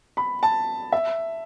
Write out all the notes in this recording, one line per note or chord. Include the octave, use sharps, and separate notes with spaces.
B5
A5
E5